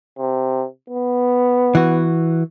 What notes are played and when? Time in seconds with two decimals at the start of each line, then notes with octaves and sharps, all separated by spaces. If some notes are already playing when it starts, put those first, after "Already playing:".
0.18 C3
0.90 B3
1.75 E3 F#4